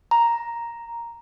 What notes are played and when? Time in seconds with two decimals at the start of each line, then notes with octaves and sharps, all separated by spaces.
0.11 A#5